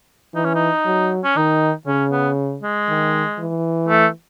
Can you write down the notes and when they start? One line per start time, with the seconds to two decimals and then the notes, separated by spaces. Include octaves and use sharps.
0.34 E3 D#4
0.44 C#4
0.54 D#4
0.85 F#3
1.24 C#4
1.36 D#3 D#4
1.87 C#3 C#4
2.11 B3
2.63 G#3
2.88 D#3
3.39 E3
3.88 A3